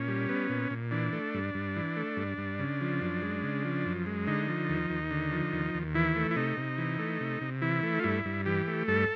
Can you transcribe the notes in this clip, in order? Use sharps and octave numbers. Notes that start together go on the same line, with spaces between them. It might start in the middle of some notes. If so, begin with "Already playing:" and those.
Already playing: A#2 C#4
G3
B3
A#2
A#2
E3 D4
A3
G2
G2
E3
A3
G2
G2
C#3
F3
F#2
G#3
C#3
F3
F#2
G#3
D3 D#4
F3
D#2
D#2
D3
F3
D#2
D#2
E3 E4
A3
E4
C3 D#4
C3
E3
A3
C3
C3
E3 E4
A3
F4
G2 E4
G2
E3 G4
A3
G2 A4